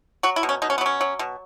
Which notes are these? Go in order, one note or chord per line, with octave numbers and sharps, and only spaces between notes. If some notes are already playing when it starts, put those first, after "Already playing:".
F#3 F#4
E4
B2
C#4
B2 D#4
C#4
B3
F#3 C#4
F#3
B2